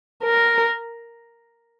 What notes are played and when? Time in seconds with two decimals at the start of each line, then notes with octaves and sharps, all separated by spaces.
0.23 A#4